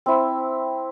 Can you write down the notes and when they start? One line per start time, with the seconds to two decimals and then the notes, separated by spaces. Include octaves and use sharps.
0.06 C4 E4